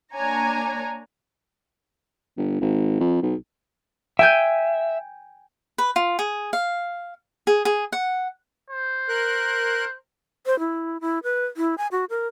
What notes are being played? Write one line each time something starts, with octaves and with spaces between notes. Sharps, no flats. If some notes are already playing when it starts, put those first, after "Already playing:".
A#3 D4 C#5 G#5 A#5
G1
G#1
F2
B1
E5 G5 G#5 G6
B4
F4
G#4
F5
G#4
G#4
F#5
C5
A#4 F#6
C5
E4
E4
B4
E4
G#5
F#4
A#4